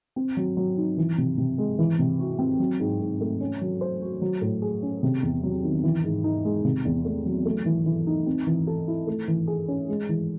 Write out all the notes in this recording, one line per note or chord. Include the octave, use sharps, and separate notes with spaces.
C4
F#3
F#3
D#4
E3
C3
C3
G#3
E3
C3
F#4
C4
F#3
G#2
G#2
A3
C#4
F#3
C5
F#4
F#3
A2
G#4
C#4
C3
E2
F#3
D#3
E3
G#2
D#4
G#3
C3
E2
A3
F#3
A3
E3
E3
D#4
C4
E3
A4
E4
A3
E3
G#4
C#4
G#3
E3